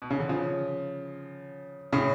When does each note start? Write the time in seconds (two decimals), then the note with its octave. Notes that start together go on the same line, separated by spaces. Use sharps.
0.02 B2
0.11 C#3
0.20 D3
0.29 C#3 F3
1.93 A2 C#3